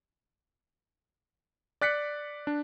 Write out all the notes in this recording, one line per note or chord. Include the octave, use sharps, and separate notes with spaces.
D5 F#6 B6 C#7
D4